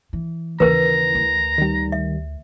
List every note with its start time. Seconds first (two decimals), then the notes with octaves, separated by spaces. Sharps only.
0.13 E3
0.60 D#2 C#3 E3 A#4 B4 A#5
1.15 D2
1.58 D#3 G3
1.92 E5